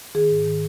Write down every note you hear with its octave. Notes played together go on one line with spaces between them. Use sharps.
D#3 G#4
G#2
D#3